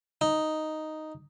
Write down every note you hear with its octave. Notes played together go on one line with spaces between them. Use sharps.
D#4